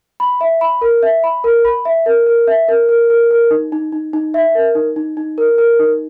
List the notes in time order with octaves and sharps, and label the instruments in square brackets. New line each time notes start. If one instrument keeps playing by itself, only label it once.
[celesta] B5
E5
B5
A#4
E5
B5
A#4
B5
E5
A#4
A#4
E5
A#4
A#4
A#4
A#4
D#4
D#4
D#4
D#4
E5
A#4
D#4
D#4
D#4
A#4
A#4
D#4